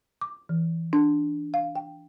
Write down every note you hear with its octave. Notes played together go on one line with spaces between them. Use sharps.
D6
E3
D4
F5
G5